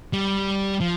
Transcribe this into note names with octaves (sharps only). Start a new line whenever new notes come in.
G3
F3